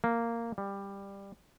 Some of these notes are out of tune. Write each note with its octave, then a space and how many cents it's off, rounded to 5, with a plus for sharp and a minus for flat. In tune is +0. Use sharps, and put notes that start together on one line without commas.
A#3 -10
G3 +15